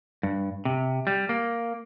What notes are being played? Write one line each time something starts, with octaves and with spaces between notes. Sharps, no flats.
G2
C3
G3
A#3